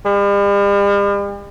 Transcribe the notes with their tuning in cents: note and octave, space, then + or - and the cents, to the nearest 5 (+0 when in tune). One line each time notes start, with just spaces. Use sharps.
G3 +45